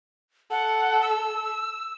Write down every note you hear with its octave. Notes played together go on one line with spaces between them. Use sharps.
A4 F#5
E6